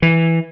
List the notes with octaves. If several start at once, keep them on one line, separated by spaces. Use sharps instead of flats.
E3